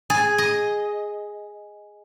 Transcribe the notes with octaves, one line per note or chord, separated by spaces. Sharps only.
G#4
D#5